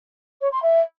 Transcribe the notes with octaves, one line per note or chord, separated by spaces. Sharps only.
C#5
C6
E5